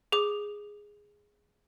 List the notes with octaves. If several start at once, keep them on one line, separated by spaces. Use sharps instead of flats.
G#4 D6